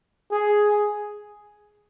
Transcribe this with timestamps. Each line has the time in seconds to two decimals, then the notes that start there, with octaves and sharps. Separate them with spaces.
0.31 G#4